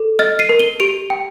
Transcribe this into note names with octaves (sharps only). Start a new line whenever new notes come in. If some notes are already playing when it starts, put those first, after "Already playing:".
Already playing: A4
D#5 F6 A6
C7 D#7
A#4
D#7 G7
G4 D7 F7
G5